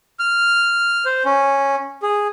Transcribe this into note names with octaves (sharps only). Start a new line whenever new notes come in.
F6
C5
C#4
G#4